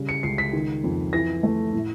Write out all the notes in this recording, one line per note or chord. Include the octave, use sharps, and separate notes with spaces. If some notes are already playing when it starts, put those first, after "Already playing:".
Already playing: C#3 G3
C#7
C#2 C7
B6
D#3
F2
E3 A#6
A3
A2